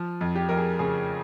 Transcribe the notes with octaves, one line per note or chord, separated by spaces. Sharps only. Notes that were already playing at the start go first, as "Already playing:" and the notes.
Already playing: F3
F2
G4
F2 A#4
G#4
C#3 G#4